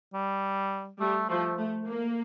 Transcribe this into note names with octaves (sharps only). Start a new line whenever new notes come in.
G3
G3 A3
F3 A3
A3
A#3